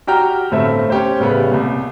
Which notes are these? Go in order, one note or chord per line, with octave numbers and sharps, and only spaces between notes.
F#4 G4 G5 A#5 F6
G1 A2 A3 C4 E5
C#4 G4 C5
A2 C#3 G3 B3
C2 A#2